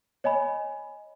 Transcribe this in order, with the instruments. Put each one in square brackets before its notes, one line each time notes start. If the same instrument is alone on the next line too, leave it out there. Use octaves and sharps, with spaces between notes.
[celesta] C#5 D#5 G#5 B5